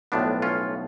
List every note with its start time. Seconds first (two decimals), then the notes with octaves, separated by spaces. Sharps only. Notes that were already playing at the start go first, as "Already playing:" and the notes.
0.12 B1 A2 F3 B3 D4
0.42 C#4 F4